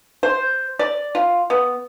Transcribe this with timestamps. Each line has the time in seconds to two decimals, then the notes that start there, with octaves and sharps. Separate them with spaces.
0.23 C5
0.79 D5
1.15 F4
1.50 B3